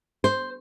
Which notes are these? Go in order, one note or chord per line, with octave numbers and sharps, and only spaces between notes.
C5